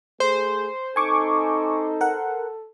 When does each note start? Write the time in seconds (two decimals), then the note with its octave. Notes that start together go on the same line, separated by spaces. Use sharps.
0.20 A3 G#4 C5
0.96 C4 D#4 A4 G#5 C#6 D6
2.01 A#4 F#5